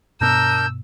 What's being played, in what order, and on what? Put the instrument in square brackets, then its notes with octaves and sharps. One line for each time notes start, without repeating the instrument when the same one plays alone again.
[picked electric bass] G2 B2 B3 [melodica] D4 A#4 A#5 [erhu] E6 [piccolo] G6